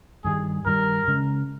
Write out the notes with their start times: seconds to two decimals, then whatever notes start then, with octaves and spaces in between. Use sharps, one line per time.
0.24 G2 D#3 G3 G#4
0.66 G2 D#3 G3 A#4
1.08 C#3 G#3 C#4